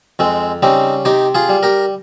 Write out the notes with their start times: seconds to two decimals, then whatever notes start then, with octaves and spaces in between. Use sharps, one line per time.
0.19 F2 G#3 C4
0.63 C#3 G3 C4 D#4
1.05 C3 D#4 G4
1.35 F4 G#4
1.49 G3
1.63 G4 A#4